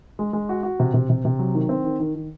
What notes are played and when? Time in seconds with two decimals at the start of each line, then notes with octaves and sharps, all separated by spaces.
0.19 G#3
0.33 G#3
0.49 F#4
0.63 F#4
0.80 C3
0.94 C3
1.10 C3
1.25 C3
1.39 F#3
1.54 D#3
1.69 C4
1.84 D#3
2.00 D#3
2.15 D#3